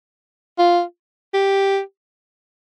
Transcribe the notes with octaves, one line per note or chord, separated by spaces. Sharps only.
F4
G4